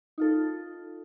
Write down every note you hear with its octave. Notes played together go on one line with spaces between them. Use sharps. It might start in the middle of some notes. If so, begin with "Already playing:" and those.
D#4 F4 A4